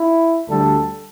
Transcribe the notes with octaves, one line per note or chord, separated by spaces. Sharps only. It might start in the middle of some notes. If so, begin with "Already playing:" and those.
Already playing: E4
D2 D3 G3 A4